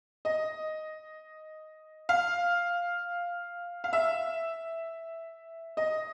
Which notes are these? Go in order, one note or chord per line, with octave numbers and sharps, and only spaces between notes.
D#5
F5
F5
E5
D#5